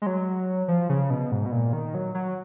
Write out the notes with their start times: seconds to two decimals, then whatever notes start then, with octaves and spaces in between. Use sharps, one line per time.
0.02 G#3
0.06 F#3
0.68 F3
0.89 C#3
1.10 B2
1.31 G#2
1.46 B2
1.51 A#2
1.73 D#3
1.94 F#3
2.15 F#3